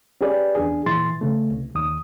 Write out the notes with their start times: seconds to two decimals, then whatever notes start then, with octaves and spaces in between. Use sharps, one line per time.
0.21 C#4 G4 G#4 B4 D5
0.55 E2 D4 G#4
0.86 A#2 E3 C6 A6
1.21 C#3 A3
1.50 C2
1.75 D#2 D#6